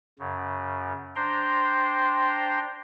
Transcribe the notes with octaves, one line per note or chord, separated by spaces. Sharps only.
F#2 C#3
D4 C5 G5 A#5 C6